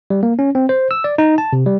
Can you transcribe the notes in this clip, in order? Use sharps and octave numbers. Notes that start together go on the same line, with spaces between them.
G3
A#3
C#4
C4
C5
E6
D5
D#4
A5
C3
G3